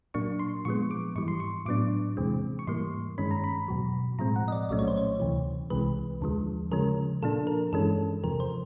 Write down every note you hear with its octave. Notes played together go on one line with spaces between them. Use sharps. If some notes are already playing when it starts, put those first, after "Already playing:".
A#2 F#3 A#3 D4 C#6
C6
A#2 F3 G#3 B3 C#6
D6
G#2 E3 G3 C#6
C6
C#6
A2 F#3 B3 D4 D6
E2 C3 E3 G#3 C4
C#6
G#2 E3 G3 A#3 C6
G2 D#3 G#3 C#4 B5
A#5
B5
E2 B2 F#3
A2 F3 G#3 C4 A#5
F#5
D#5
D5
C2 A#2 F#3 A3 C#4 D5
C#5
C5
C#5
D2 C3 E3
C2 C3 E3 G#3 B4
D#2 D3 F3 G#3
C#3 F3 G#3 C#4 A#4
A#2 F3 A#3 D4 A4
A#4
G2 E3 G#3 C#4 A4
E2 C3 F3 A#4
C5